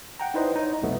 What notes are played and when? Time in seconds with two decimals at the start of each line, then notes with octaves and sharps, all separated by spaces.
0.20 F#5 G5 A#5
0.34 D#4 E4 B4 C5 D5 D#5
0.56 D#4 C#5
0.82 C2 F2 B2 A3 B3